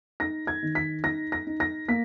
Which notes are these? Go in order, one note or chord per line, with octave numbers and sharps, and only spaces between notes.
D#4 A#6
G#6
D#3
B6
D#4 A#6
A#6
D#4
A#6
A#3 B6